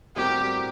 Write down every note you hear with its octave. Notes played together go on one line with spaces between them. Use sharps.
A2 G3 C4 F#4 G4 A#4